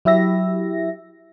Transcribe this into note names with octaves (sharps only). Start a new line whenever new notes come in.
F#3 E4 G4 E5 A#6